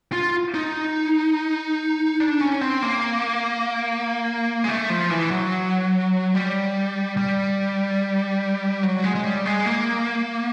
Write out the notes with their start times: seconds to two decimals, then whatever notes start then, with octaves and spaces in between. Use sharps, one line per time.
0.13 F4
0.54 D#4
2.20 D4
2.41 C#4
2.61 C4
2.82 A#3
4.64 G#3
4.69 A3
4.90 F3
5.10 E3
5.31 F#3
6.34 G3
7.17 G3
8.83 F#3
9.04 G#3
9.15 G#3
9.25 G3
9.45 G#3
9.66 A#3